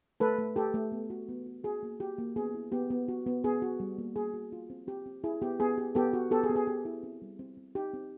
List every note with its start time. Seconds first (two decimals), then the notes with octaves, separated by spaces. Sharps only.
0.20 A3 A4 B4
0.38 A3
0.56 A3 G4 A4
0.74 A3
0.92 B3
1.10 F#4
1.29 B3
1.46 F#4
1.64 F#4 G#4
1.83 A#3
2.00 F#4 G4
2.18 A#3
2.36 B3 G#4
2.54 E4
2.72 B3 G4
2.90 B3
3.08 F#4
3.27 B3
3.44 B3 G#4
3.62 F#4
3.80 G3
3.98 A#3
4.16 A#3 G#4
4.34 F#4
4.52 F4
4.70 C4
4.87 C4 G4
5.06 C4
5.24 E4 G#4
5.42 B3 G4
5.60 B3 G#4
5.78 G4
5.95 B3 G4 A4
6.13 F#4
6.31 B3 G4 A4
6.44 G#4
6.49 B3
6.56 G#4
6.67 G4
6.85 E4
7.03 C4
7.22 G3
7.39 C4
7.57 C4
7.75 D#4 G4
7.94 C4